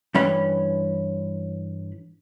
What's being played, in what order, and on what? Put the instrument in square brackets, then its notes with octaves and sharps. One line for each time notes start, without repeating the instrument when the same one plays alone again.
[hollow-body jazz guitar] G2 E3 C#4 B5